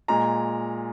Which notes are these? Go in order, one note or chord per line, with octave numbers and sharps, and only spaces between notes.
A#2 G#3 A#5